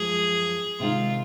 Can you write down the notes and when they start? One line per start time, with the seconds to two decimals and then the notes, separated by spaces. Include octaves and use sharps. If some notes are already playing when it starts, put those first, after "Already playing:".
Already playing: F#2 F3 G#3 G#4
0.80 C3 D#3 G#3 D#4 F4